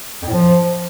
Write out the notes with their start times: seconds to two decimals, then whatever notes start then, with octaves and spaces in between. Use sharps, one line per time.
0.22 F2
0.27 A2
0.32 F3